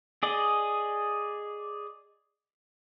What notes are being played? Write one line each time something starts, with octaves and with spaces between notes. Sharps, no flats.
G#4 D5 D#5